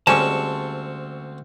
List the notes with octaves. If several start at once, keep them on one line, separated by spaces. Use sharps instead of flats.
D2 G3 G#3 C4 C#4 A5 C#6